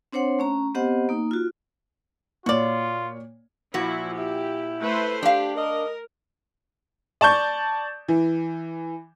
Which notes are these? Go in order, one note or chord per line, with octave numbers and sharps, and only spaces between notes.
C4 D4 C5 C#5 F#5 C6
A3 C#4 A#5
B3 C4 G4 C5 D#5 F#5
A#3 D#4
F4 F#4
A#2 F4 F#4 C#5 D5
A#2 F3 E4 F#4
E4 G4
A3 B4 C5
D4 G4 F5
A#4 D#5
D5 A5 C#6 G6
E3